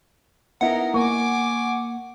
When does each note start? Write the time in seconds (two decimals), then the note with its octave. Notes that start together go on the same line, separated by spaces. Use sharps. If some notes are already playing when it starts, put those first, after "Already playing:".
0.61 B3 D#4 E4 A#4 F#5
0.94 A#3 G#5 C#6 D6